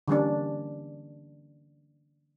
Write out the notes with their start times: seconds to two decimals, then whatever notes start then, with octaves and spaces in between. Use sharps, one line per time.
0.08 D3 E3 G3 A#3 C#4 D4